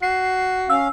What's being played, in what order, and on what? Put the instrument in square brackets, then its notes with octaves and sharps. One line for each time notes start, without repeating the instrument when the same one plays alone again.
[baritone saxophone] F#4 [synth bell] C7
[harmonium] C#4 F5 [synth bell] E6